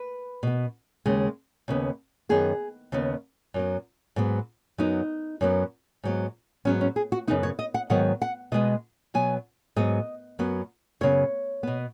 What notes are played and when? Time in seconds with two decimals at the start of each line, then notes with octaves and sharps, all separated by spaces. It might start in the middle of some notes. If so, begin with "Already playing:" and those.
Already playing: B4
0.43 B2 B3
1.06 D#2 C#3 G#3
1.68 D#2 C#3 B3
2.29 F#2 D#3 B3 G#4
2.92 D#2 C#3 B3
3.54 F#2 F#3 B3
4.16 G#2 F#3 B3
4.78 F#2 F#3 B3 D#4
5.41 F#2 F#3 B3
6.03 G#2 F#3 B3
6.65 G#2 F#3 B3 C#4
6.81 C#4
6.96 G#4
7.12 F#4
7.27 F#2 C#3 B3 D#4
7.43 C#5
7.59 D#5
7.74 F#5
7.90 G#2 D#3 F#3 B3 F#5
8.22 F#5
8.52 B2 G#3 B3 D#5
9.14 B2 F#3 B3 G#5
9.76 G#2 F#3 B3 D#5
10.39 F#2 F#3 B3
11.01 F#2 C#3 B3 C#5
11.63 B2 B3